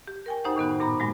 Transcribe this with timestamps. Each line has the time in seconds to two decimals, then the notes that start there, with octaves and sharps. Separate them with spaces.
0.07 G4
0.26 A#4 G5 G#5
0.44 F#2 D#4 G4 C5 F#5
0.56 A2 D#3 B3 F#4
0.80 G2 A#2 A#5 B5
0.99 G2 F#3 G#3 A#3